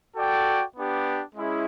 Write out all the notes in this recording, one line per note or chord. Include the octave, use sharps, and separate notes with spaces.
F#4 A4 D5 G5
B3 D4 G4
G#3 C#4 E4 G#4